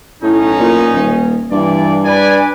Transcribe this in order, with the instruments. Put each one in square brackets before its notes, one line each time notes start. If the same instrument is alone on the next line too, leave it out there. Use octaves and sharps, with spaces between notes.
[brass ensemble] B1 C#4 D#4 [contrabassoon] A2
[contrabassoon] A#2
D#1
[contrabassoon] G2 [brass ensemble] E3 D5
[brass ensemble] B4 D5 G#5